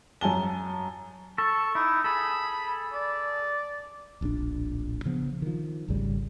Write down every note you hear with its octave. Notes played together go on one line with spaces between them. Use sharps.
F#2 G#5 A5 G7
A4 C#6
D#4 E4
G#4 A4 B5
D5
D1 A#1 C#4 D4
C#3 F3 B3
D#3 F3
G#1 D2 C#3 G3